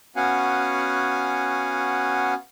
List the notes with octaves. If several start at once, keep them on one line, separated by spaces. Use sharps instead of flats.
B3 C#4 F#4 F5 F#5 G#5